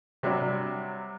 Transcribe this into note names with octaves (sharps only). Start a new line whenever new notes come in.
C3 F#3 G3 D4